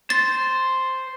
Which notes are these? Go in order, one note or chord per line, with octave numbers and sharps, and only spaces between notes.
C5 A6